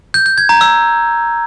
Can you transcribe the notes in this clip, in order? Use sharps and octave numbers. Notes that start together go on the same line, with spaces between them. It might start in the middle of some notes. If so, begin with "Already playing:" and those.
G6
G6
G#6
A#5
E6